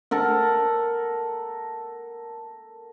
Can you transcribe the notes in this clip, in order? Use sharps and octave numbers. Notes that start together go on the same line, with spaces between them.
A4 A#4 F#5